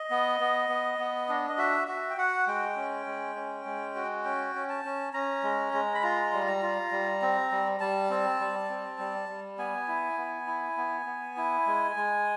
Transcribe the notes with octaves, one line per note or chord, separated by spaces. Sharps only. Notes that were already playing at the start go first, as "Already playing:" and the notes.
Already playing: D#5
B3
B3
B3
B3
D4
D#5
F#4 E5
F#4 E5
G5
F#4 F#5
G#3 G5
C#4
G#3
C#4
G#3
F#4
C#4 G5
C#4
A5
C#4
C#4 A#5
G#3
G#3
B5
F4 A#5
G3
A#5
F4
G3
C4
G3
G3 A5
C4
G3
C4
G3
G3
B3 G#5
E4
B3
E4
B3
B3
E4
G#3
G#3